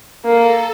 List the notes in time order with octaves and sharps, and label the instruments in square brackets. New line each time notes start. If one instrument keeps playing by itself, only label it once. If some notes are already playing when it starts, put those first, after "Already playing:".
[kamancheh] A#3 [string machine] A4